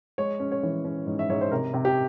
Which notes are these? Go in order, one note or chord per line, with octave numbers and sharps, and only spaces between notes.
G#3 C#5
C#4
C#5
E3
C#4
G#2
E5
G#2 C#5
C5
C3 A#4
C3
G4